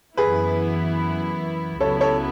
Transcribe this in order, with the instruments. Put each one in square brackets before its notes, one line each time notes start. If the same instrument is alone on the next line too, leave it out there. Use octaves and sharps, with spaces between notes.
[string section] F#2 E3 B3 E4 [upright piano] G#4 B4
[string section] C#2 C#3 F#3 B3 E4 [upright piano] A4 C#5
[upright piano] A4 C#5